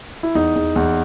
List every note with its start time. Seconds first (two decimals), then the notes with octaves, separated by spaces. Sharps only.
0.23 E4
0.35 E2 D#4
0.56 E2
0.76 E2